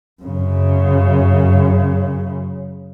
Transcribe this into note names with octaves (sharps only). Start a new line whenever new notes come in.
F#2 C#3